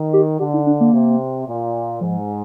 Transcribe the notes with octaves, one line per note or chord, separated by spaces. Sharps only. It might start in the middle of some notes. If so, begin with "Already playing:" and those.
Already playing: D#3
G4
D3 G4
D#4
D4
A#3
C3
A#2
G#2 F3